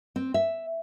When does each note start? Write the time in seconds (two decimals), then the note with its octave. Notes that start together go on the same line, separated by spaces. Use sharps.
0.16 C4
0.34 E5